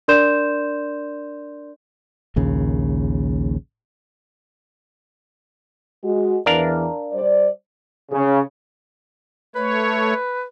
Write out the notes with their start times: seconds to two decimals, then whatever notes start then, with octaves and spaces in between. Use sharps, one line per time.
0.08 D4 A#4 D5 C6 G6 E7
2.36 A#1 D#2 C#3
6.04 G#3 F#4
6.46 E2 E3 D4 A#4 F5
7.12 G3 C5 D5
8.11 C#3
9.55 A3 B4 C#5